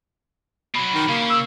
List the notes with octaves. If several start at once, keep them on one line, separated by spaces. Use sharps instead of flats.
B2 F#3 B5
D#3
C#3 A#3
E6